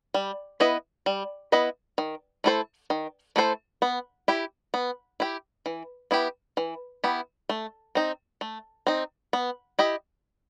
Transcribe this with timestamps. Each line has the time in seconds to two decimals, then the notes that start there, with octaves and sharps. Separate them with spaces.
0.14 G3
0.60 B3 E4 B4 D#5
1.06 G3
1.52 B3 E4 B4 D#5
1.98 D#3
2.44 A3 E4 A4 C5
2.90 D#3
3.36 A3 E4 A4 C5
3.82 B3
4.28 E4 G4
4.74 B3
5.20 E4 G4
5.66 E3
6.11 B3 E4 G4
6.57 E3
7.04 B3 E4 G4
7.49 A3
7.95 C4 D#4
8.41 A3
8.87 C4 D#4
9.33 B3
9.79 E4 G4 D#5